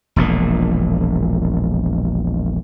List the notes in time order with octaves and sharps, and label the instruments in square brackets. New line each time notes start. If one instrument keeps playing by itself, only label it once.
[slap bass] E1 A#1 A#2